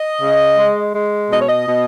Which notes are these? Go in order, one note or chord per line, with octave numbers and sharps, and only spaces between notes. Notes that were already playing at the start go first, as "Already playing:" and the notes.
Already playing: D#5
C#3
G#3
G#3
B2 D#5
C#5
D#5
B2